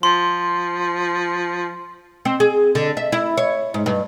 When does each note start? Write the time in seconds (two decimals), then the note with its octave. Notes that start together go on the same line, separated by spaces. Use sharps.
0.03 F3 C6
2.25 C4
2.40 G#4
2.75 D3
2.97 E5
3.12 E4
3.37 C#5
3.74 G#2
3.86 G2